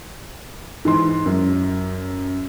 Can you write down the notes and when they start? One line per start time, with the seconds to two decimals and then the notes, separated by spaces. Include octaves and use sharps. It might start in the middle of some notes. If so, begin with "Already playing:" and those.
0.85 G#2 E3 C6
1.26 F#2